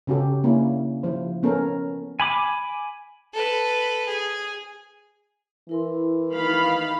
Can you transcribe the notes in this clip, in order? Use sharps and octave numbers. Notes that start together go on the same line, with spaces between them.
C#3 C#4 F#4 G4 A4
A#3 C#4 D4 E4
F3 E4 C5
B3 C#4 A4 A#4
G#5 B5 D6
A4 B4
G#4
E3 E4 A#4 C6
D#3 F5 B5